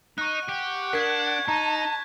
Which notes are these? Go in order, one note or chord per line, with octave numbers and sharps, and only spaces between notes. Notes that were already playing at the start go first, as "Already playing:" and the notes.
D#4 C#6 F#6
G4 F#5
D4 A#4 F#6 G#6 B6
D#4 A5 A#5